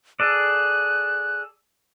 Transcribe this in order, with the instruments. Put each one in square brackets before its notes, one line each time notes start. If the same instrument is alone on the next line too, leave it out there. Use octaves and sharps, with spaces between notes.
[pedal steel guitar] G#4 A4 D5 [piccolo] F#6